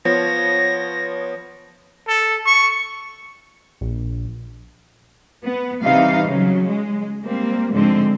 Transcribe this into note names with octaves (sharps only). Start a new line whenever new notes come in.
F3 B3 C#5 A#6
A4
C#6
A#1
B3
C3 E3 G3 D#4 F5
C#3 F#3
G#3
G3 A#3 C4
G#2 D3 F3 G#3 C4